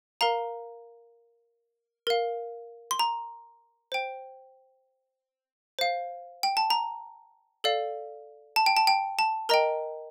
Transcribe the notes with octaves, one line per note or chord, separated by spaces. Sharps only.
A#4 F5 A#5
A#4 F5
C6
A#5
C5 G5
C5 F5
G5
A5
A#5
A4 D5 F5
A5
G5
A5
G5
A5
A#4 D#5 G5 A#5